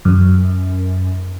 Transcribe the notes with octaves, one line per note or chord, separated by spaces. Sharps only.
F#2